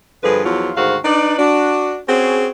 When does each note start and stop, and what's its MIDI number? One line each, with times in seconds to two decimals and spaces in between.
0.23 0.40 43
0.23 0.40 50
0.23 0.40 53
0.23 0.40 68
0.23 0.40 71
0.45 0.71 40
0.45 0.71 53
0.45 0.71 54
0.45 0.71 65
0.77 0.97 38
0.77 0.97 44
0.77 0.97 51
0.77 0.97 66
0.77 0.97 72
0.77 0.97 77
1.04 1.35 62
1.04 1.35 63
1.04 1.35 71
1.04 1.35 74
1.38 1.99 62
1.38 1.99 66
2.08 2.48 60
2.08 2.48 61
2.08 2.48 66
2.08 2.48 68